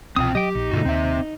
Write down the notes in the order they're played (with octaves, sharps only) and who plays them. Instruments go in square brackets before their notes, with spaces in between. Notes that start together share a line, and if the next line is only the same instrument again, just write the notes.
[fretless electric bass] C2 B2 [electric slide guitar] C4 F4 G5 [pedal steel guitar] D#6
[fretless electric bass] F#3 [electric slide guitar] G4 [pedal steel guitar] D#5 G5
[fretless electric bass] A#1 [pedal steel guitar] D#4
[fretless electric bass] G2 B2 D3 [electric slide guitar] A3 F4 F#4
[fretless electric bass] D#2 [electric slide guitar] C4 E5